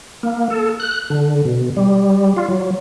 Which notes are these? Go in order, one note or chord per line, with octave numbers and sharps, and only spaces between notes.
A#3
A4
F#6
D3
B2
G3
F4
F#3